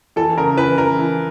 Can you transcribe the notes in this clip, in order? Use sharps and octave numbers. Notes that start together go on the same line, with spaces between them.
E3 A4
C#3 A#4
E3 B4
E3 A#4
E3